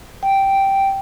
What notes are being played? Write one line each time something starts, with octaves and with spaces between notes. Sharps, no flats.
G5